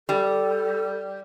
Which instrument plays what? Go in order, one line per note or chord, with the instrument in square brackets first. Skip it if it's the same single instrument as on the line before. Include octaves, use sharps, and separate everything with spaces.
[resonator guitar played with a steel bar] G3 [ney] A4